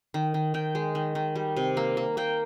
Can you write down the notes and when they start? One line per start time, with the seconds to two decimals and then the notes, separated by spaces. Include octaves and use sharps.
0.14 D#3
0.34 D#3
0.54 D#3 G5
0.75 G#3
0.95 D#3
1.15 D#3
1.35 G3
1.57 C3
1.77 A#3
1.97 A#3
2.17 A#3 G5